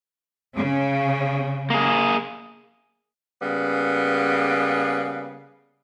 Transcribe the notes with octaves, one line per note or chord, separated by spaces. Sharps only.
C#3
A#3 G#4
C#3 G3 A#3 B3